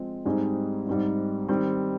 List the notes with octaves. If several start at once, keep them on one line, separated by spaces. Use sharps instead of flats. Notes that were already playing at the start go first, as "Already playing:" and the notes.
Already playing: F3 G#3 C4
G#2 G3 C4 D#4 G#4
G#2 G3 C4 D#4
D#3 G3 C4